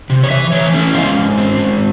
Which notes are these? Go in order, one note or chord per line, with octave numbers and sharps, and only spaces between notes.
C3
C#5
E3 E5
E3 C#5
C#4 E4
G#2 F4
G#2
C4
G#2